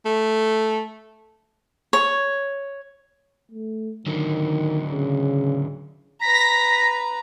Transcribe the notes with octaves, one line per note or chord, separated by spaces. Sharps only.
A3
C#5
A3
D3 D#3 F#3
C#3
B4 A#5 A#6 B6